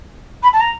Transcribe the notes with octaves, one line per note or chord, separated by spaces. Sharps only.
B5
A5
A#5